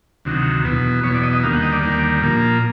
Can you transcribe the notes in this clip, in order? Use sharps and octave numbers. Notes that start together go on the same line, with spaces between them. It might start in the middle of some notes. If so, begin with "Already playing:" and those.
D2 C3 D#3 F#3
E2 B2 F#3 B3
E2 B2 F#3 B3 C#5
D5
D#5
D#5
D#2 D3 G3 A#3 F5
F#5
D#5
D5
D#2 D3 G3 A#3
A#2 F3 A#3